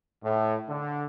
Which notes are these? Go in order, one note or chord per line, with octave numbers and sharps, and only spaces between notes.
A2
D3